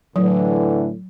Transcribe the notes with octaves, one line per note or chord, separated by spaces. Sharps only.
A2 D3 E3 F#3